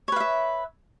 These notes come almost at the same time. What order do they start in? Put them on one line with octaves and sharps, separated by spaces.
C#5 B4 F5 E5